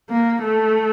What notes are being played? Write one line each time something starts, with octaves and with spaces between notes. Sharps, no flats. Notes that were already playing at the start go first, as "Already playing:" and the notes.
A#3
A3